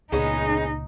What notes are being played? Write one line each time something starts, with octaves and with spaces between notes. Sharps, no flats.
C#2 A#2 G#3 B3 C#4 D#4